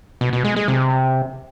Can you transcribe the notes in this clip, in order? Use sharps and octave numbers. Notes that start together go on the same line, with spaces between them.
B2
B2
G#3
G#3
C3